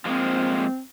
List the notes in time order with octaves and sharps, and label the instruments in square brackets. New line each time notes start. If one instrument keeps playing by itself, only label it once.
[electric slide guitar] F3 G#3 A#3 [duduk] C4